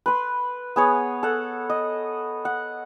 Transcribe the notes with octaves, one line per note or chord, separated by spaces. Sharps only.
B4 C6
B3 G#4 C#5
A4 F#5
D#5
F#5